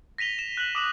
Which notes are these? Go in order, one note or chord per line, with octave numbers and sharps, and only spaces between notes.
A#6 B6 D#7 F7 G7
E7
F#6 F#7
D6 D#6 D#7 E7 F#7